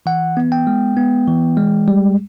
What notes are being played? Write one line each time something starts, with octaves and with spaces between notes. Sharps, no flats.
E3 F#5
B3
G5
G#3
B3
E3
G#3
G3